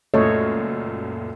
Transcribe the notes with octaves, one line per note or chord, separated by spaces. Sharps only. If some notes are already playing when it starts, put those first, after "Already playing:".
C#2 F#2 A#2 A3 C#5 D#5